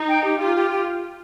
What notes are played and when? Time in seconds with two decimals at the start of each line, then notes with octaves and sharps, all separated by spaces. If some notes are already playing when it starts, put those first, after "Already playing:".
Already playing: D#4
0.08 G5
0.24 G4
0.39 F4 G4
0.55 G4
0.71 G4